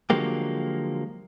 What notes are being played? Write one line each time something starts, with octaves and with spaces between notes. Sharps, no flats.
D3 F3 F#3 G#3 A#3 G4